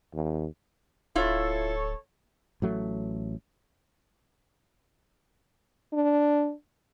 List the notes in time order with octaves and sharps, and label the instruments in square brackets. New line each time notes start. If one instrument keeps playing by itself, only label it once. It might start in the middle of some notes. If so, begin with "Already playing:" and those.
[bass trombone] D#2
[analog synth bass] D1 [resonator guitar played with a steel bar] E4 F4 [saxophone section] A4 C#5
[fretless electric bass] A1 F#3 A3
[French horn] D4